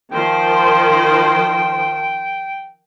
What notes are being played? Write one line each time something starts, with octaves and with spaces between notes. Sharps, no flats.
D#3 F3 C5 G5